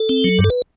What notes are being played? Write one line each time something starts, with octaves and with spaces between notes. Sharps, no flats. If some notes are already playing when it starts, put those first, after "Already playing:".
Already playing: A4
C4
F#3
G2
A4
B4